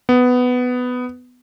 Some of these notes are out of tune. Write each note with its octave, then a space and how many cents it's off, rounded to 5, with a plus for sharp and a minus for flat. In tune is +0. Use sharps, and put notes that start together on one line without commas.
B3 +10